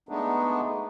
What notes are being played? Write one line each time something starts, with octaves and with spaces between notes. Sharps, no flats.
G#3 A3 B3 D4 D#4